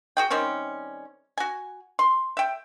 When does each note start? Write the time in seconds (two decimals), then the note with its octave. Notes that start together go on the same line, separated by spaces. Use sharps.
0.17 F#4 G#4 G5
0.30 D#3 G3 C4 C#4
1.38 F#4 G#5
1.99 C6
2.37 E5 G5